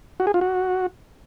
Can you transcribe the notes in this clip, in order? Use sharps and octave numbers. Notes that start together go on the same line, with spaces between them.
F#4
G#4
F4
F#4